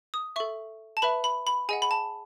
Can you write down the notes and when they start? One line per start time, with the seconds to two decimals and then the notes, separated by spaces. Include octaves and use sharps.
0.14 D#6
0.36 A4 E5 C#6
0.97 A5
1.02 B4 E5 B5
1.24 B5
1.47 B5
1.69 G#4 D#5 F#5 G#5
1.82 B5
1.91 A5